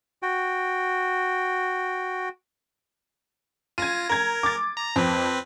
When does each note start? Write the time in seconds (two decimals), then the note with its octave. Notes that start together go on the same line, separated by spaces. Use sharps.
0.22 F#4 G5
3.78 F4 G#6 A#6 D#7
4.09 A#4 A#5 G#6
4.43 D6 A6
4.77 A#5
4.96 F2 C4 B4